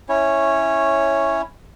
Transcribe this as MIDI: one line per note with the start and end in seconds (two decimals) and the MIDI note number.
0.09 1.42 61
0.09 1.42 64
0.09 1.42 73